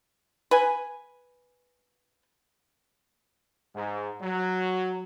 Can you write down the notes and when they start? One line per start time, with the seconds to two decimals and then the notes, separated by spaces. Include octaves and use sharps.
0.51 B4 G#5
3.74 G#2
4.21 F#3